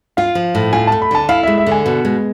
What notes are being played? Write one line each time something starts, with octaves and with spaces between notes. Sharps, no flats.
F4 F5
F3
A2
F4 G#5
A3 A5
B5
D3 A5
E4 F5
G#3 E5
E5
D3
G#5
B2
G#3